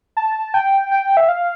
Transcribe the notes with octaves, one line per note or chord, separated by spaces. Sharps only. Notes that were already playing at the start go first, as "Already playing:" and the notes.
A5
G5
G5
E5
F5